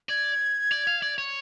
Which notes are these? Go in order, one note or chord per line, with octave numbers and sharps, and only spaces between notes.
D5 G#6
D5
F5
D5
C#5